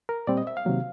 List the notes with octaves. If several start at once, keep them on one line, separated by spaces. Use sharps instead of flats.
A#4
A#2 G3 C4 D5
D#5
E5
F5
C3 D#3 F#3 A#3